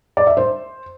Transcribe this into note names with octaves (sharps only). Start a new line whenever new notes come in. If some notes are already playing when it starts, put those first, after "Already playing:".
D5
E5
C5